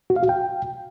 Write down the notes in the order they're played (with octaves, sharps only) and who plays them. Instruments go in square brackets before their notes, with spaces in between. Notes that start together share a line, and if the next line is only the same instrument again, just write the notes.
[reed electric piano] F#4
F5
F#4
G5